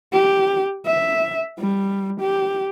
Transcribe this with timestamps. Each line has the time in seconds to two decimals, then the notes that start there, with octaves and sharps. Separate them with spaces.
0.13 G4
0.86 E5
1.59 G3
2.20 G4